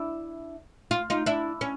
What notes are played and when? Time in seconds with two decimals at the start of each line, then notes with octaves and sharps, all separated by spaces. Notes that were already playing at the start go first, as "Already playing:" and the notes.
Already playing: D4 E4
0.91 F4
1.10 D#4 F4
1.26 D4 E4
1.61 C#4